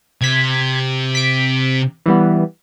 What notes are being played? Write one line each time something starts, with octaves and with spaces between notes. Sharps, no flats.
C3 G#6 B6
B6 D7
E3 G3 B3